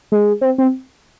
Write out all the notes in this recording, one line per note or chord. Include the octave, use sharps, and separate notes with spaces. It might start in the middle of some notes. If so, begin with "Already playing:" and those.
G#3
C4
C4